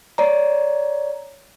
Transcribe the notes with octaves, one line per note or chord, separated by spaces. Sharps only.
C#5 D5 A#5